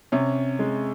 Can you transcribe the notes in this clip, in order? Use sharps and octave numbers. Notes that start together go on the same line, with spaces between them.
C3 C#4
G#3